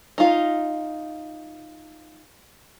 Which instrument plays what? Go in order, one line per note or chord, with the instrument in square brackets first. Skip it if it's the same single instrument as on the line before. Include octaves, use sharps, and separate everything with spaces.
[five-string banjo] D#4 F4